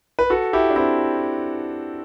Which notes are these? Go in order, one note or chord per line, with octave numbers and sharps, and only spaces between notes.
B4
F#4 A4
E4 G4
D4
C4 E4